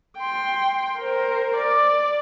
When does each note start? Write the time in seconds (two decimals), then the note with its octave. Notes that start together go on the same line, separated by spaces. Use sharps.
0.19 G5 C6
0.99 A#4 C5
1.57 D5